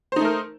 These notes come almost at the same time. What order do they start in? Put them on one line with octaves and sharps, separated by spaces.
C5 D#4 A3 A#4